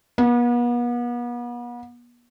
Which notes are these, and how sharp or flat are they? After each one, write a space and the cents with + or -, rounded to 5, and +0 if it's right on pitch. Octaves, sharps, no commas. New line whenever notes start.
B3 -40